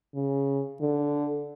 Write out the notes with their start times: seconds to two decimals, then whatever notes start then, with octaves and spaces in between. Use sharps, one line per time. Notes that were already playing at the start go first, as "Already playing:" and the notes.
0.15 C#3
0.81 D3